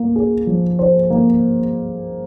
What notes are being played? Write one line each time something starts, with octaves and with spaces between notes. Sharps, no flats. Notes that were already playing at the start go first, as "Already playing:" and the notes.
Already playing: A#3
G#4
F3
C5
A#3